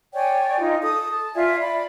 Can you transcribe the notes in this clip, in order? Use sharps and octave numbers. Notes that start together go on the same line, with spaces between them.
C#5 D5 G5 G#5
D#4 F4
A4 D#6
A5
F4 D5 E5 G#5
D5 B5